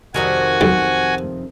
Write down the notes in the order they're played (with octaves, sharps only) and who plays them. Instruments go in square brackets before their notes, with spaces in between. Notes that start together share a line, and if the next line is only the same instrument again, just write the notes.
[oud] F2 C3 D#3 [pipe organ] F#4 G#5
[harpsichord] B1